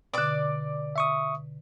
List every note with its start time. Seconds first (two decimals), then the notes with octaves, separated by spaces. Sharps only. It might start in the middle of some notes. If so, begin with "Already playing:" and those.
0.14 B2 D3 D5 D6
0.96 E5 C#6 D#6